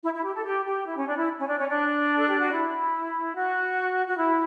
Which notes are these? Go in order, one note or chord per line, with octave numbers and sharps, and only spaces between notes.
E4
E4
G4
A4
G4
G4
E4
C#4
D4
E4
C#4
D4
C#4
D4
A4
G4
F#4
E4
F#4
F#4
E4